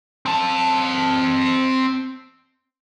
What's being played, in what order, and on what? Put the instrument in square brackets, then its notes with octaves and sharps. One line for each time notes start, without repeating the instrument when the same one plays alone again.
[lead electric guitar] C4 A5